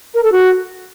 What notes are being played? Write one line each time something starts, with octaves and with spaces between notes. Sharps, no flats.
A#4
A4
F#4